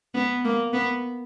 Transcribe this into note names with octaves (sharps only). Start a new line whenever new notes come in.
B3
A#3
B3